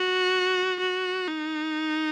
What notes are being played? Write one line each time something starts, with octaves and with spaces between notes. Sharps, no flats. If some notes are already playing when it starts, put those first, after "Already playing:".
Already playing: F#4
F#4
D#4